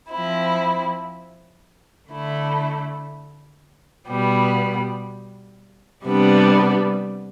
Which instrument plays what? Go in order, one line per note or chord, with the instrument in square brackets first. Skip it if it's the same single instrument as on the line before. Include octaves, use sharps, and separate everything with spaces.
[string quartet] F3 C4 E4
D3 A3 E4
B2 G3 B3
C3 G3 B3 D4